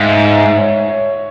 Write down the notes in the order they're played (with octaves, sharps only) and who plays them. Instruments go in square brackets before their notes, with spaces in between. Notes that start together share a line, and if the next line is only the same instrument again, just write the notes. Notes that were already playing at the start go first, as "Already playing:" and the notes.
Already playing: [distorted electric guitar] G#2 [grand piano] E5 F5 G5
[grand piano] E5
C#5
C#5